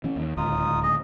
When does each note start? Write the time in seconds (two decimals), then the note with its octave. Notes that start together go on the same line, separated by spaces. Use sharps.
0.04 E3 C#4
0.16 D#2
0.37 D1 C#2 D#4 F4 D#6
0.83 G#4 D#5